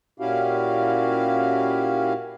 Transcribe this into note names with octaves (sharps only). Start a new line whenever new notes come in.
A#2 C#4 E4 F#4 G4 F5